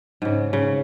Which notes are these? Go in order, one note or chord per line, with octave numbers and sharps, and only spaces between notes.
G#2 C#3
C#3